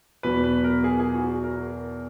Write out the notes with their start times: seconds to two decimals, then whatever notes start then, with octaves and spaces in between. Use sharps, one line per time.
0.23 E2 B2 F#3 B4
0.44 B4
0.64 A#4
0.84 G#4
1.00 G#4
1.14 F#4
1.44 A#4